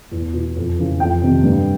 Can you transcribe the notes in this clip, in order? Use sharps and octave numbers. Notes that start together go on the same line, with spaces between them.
E2
B2
F2
C#3 E3
F2 G5
C3 D#3
G2